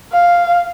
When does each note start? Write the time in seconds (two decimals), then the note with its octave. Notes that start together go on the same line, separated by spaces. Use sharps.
0.13 F5